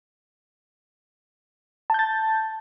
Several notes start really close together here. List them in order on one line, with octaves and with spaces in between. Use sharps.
A5 G6 A6